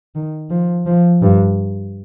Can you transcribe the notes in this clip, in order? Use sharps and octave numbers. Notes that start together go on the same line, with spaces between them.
D#3
F3
F3
G2